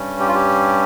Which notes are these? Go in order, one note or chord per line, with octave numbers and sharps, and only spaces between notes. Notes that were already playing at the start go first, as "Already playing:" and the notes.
Already playing: G2 G3 C#4
G4
F4
G4